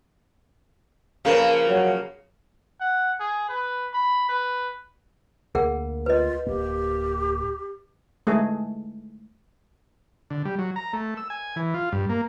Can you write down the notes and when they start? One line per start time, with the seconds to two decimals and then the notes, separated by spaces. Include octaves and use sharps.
1.25 C#3 F3 A#3 A#4 B4
1.68 F#3
2.80 F#5
3.20 G#4
3.49 B4
3.93 B5
4.29 B4
5.55 D2 A#3 G#4 A#4 F#5
6.06 F4 B4 D#5
6.47 D1 A#3 G4
8.27 G#3 A3 G#4
10.31 D3
10.45 G3
10.59 F#3
10.76 A#5
10.93 A3
11.17 E6
11.30 G#5
11.56 E3
11.74 F4
11.92 G2
12.09 A#3